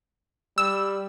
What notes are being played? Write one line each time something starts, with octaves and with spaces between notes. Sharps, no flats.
G3 E6